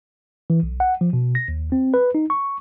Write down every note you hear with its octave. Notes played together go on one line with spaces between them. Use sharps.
E3
B1
F#5
F3
B2
A#6
D#2
C4
B4
D#4
C#6